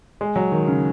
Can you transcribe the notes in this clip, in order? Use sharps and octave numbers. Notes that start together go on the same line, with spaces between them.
G#3
F#3
D#3
C#3